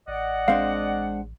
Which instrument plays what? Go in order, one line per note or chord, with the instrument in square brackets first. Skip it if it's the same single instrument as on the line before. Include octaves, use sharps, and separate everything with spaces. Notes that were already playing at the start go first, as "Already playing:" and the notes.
[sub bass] A1 [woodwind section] D5 D#5 F#5
[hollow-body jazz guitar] G#3 C4 D4 [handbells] F5